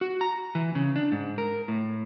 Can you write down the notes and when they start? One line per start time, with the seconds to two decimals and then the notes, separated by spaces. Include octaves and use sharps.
0.01 F#4
0.21 A#5
0.55 E3
0.75 C#3
0.96 D4
1.12 G#2
1.38 A#4
1.68 A2